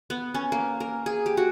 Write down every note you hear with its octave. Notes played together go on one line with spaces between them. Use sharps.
B3
C#4
A#3
A#4
G#4
G4
F#4